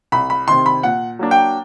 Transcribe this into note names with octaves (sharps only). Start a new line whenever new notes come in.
C2 B5
B5
C3 D#3 C6
B5
A#2 F#5
F#3 A#3 D4
G5